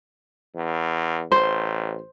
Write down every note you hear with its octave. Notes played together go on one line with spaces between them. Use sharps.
E2
A1 C5